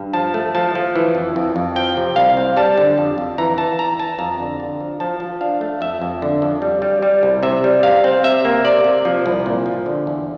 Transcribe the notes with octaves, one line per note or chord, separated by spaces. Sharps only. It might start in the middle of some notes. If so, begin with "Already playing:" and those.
Already playing: G2
F3 A5
A3
F3 A5
F3
E3
F2
F2
F2
F3 G5
C3
C2 F5
C4
G3 A5
D3
F2
F2
E3 A#5
E3 A5
E2 A#5
E3 A5
F2 A#5
D3
D3
F3
F3 A5
F3
D4 F5
A3
F2 E5
F2
D3
F2
G3
G3
G3
C2
C3 E5
G3
C3 F5
C4
C3 E5
A#3
C3 D5
C3
F3
C2
A#2
F3
D3
E2